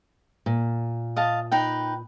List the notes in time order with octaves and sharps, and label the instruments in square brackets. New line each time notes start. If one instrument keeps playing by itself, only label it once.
[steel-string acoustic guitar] A#2
[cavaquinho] D#5 F5 A5
D#4 B4 G5